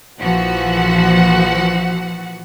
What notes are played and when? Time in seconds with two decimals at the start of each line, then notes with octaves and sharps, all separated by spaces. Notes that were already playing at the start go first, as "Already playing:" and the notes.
0.20 A#1 E3 F3 F#4 F#5